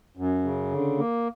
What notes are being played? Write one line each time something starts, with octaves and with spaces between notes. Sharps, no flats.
F#2
C#3
D3
A#3